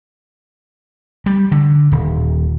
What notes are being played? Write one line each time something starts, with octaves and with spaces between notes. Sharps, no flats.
G3
D3
D#1